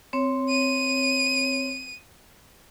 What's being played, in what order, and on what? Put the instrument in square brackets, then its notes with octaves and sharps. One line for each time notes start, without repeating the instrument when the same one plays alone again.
[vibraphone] C4 C#5
[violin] D#7